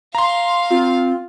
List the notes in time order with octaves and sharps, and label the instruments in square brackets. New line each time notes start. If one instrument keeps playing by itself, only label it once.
[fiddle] F5 [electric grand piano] A#5 C6
[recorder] C4 [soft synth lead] F4